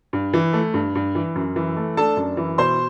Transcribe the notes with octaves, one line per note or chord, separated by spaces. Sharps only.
G2
E3
A3
G2
G2
E3
F#2
E3
A3
D4 A4 A5
F#2
E3
B2 C5 C6